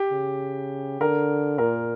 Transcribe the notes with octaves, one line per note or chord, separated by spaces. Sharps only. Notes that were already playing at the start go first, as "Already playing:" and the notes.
Already playing: G4
C#3
D3 A#4
A#2 A#4